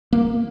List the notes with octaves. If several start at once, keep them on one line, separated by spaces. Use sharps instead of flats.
A#3